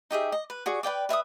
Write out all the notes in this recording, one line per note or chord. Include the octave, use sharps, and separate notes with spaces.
D#4 G4 G#4 E5
D#5
B4
F#4 G#4 D5 C#6
B4 D5 G5 D6
B4 E5 C6 D#6